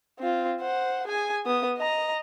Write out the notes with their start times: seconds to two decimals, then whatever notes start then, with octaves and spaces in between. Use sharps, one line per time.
0.19 C4 F4
0.61 C5 F#5
1.07 G#4 G#5
1.46 B3 D#6
1.78 D#5 A#5